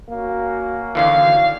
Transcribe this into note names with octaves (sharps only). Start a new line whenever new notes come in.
A#3 C#4 F#4
D#2 D3 E3 F5